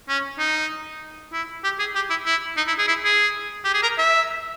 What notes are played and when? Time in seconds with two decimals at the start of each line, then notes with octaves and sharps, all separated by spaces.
0.09 C#4
0.39 D#4
1.33 E4
1.64 G4
1.79 G#4
1.95 G4
2.10 E4
2.26 E4
2.57 D#4
2.68 E4
2.79 G#4
2.88 E4
3.05 G#4
3.64 G4
3.74 G#4
3.83 A#4
3.98 E5